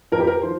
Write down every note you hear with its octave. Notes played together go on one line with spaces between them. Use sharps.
F2 F3 A#4
G4
A#4
F3 C5